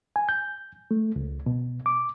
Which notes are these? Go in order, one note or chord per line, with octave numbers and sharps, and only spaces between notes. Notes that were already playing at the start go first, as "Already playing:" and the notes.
G#5
G6
A3
C#2
B2
D6